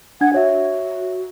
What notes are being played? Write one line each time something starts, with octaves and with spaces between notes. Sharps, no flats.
D4 F#5 G#6
F#4 C#5 E5